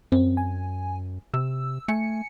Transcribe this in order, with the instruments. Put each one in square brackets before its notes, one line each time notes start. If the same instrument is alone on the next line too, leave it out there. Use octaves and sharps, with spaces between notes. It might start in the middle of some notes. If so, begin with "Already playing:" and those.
[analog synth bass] F#2 [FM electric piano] C4
[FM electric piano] G#5
[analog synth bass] C3 [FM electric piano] E6
[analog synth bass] A3 [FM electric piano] G#5 C#7